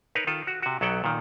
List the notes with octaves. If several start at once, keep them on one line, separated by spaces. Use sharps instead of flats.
D#4 A#4 B4 C#5
D#3 F4 A4
F#4
C3 F#4
B1 F#3 B3 A4 F#5 G5
A#2 D#3